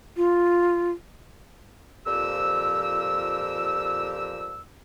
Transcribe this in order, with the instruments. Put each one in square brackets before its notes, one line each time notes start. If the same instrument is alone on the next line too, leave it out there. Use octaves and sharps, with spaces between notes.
[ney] F4
[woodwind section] F2 A#2 F3 G4 E6